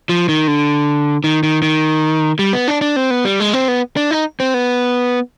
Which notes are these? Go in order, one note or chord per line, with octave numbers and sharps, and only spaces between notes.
F3
D#3
D3
D#3
D#3
D#3
G3
B3
D4
D4
C4
B3
G3
G#3
C4
B3
D4
D#4
C4
B3